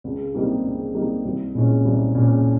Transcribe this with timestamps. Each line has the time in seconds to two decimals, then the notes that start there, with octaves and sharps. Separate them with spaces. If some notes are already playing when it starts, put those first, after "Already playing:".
0.04 C#2
0.35 C3 G3 A#3 D#4
0.64 C#2
0.94 C3 G3 A#3 D#4
1.25 C2
1.55 A#2 G#3 C#4
1.85 C2
2.15 A#2 G#3 C#4